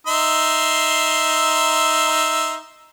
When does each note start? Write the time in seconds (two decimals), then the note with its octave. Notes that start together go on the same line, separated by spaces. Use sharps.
0.07 D#4 E5 C6